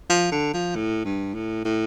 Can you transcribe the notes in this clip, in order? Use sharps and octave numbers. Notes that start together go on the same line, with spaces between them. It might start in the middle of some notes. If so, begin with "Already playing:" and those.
F3
D3
F3
A2
G2
A2
A2